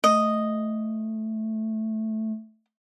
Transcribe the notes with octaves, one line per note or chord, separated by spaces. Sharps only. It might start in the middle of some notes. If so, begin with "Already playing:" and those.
A3 D#5